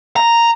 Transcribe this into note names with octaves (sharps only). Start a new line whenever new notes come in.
A#5